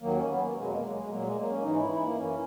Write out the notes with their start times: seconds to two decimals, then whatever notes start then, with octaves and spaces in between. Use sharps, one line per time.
0.01 D#2 D#3 F#3 A#3
0.15 C#4
0.29 B3
0.42 A#3
0.55 E2 B2 F#3 G#3
0.69 A#3
0.82 G#3
0.96 G#3
1.09 A#2 F#3 A#3
1.23 G#3
1.36 A#3
1.50 C#4
1.62 G#2 E3 D#4
1.76 E4
1.90 E4
2.03 A#3
2.16 F#2 E3 C#4